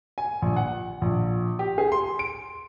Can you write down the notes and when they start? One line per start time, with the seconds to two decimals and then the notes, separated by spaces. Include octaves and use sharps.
0.18 G#5
0.42 A#1
0.56 F#5
1.01 A#1
1.59 G4
1.78 G#4
1.92 C6
2.19 D7